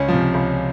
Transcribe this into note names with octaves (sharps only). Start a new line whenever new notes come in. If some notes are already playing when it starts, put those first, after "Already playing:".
Already playing: C#2 C#4
C3 F3
C#2